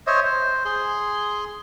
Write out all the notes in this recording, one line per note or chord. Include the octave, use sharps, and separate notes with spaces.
C5 C#5 D#5 E5
C5
G#4 C6